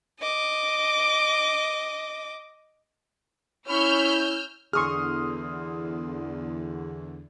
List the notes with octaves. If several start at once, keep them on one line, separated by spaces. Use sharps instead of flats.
D#5 D6
C#4 E4 B5 C#6 E6 F6 G6
E2 D3 G#4 C6 C#6 D#6 F6